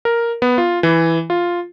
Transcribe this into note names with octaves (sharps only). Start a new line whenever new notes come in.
A#4
B3
F4
E3
F4